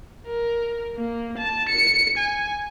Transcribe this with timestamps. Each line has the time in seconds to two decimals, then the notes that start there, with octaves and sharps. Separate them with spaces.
0.26 A#4
0.96 A#3
1.37 A5
1.68 C#7
2.17 G#5